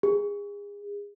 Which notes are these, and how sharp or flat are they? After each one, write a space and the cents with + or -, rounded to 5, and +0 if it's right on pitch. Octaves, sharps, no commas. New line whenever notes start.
G#4 -30